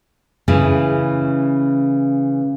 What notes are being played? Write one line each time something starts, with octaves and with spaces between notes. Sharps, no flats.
C#3 E3 A3 C#4 E4